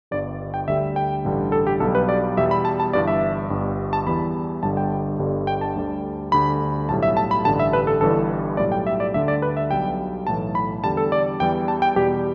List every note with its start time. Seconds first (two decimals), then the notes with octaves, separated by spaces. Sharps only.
0.11 G1 G2 G3 D5
0.54 G5
0.68 D2 D3 G3 E5
0.96 G5
1.24 A1 G2 D3 G3
1.52 A4
1.67 G4
1.80 B1 B2 G3 A4
1.95 B4
2.09 D5
2.37 E2 B2 G3 E5
2.51 B5
2.65 A5
2.80 A5
2.93 G1 G2 E3 D5
3.07 E5
3.50 G1 G2 G3
3.93 A5
4.06 E2 E3 G3 B5
4.62 G1 G2 D3 G3 A5
4.77 G5
5.19 G1 G2 D3 G3
5.47 G5
5.61 A5
5.76 D2 D3 G3
6.32 D2 D3 G3 B5
6.89 B1 A2 G3 A5
7.03 E5
7.17 A5
7.31 B5
7.45 A1 G2 D3 G3 A5
7.60 E5
7.73 B4
7.87 A4
8.01 G1 G2 E3 G3 A4
8.57 B1 A2 G3 D5
8.72 G5
8.87 E5
9.00 D5
9.14 D2 D3 G3 E5
9.28 D5
9.42 B4
9.57 E5
9.71 B1 B2 G3 G5
10.27 B1 A2 E3 A5
10.55 B5
10.84 E2 D3 G3 A5
10.97 A4
11.12 D5
11.40 E2 E3 G3 G5
11.68 A5
11.82 G5
11.96 E2 B2 G3 G4